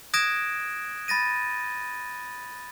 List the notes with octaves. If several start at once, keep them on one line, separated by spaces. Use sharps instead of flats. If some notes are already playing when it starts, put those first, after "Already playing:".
D#6 F#6 G#6 A#6 D7 E7
B5 A6 A#6 D#7